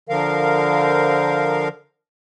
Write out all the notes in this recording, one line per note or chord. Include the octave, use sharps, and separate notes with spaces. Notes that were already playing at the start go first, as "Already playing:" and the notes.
D3 F3 A#4 F5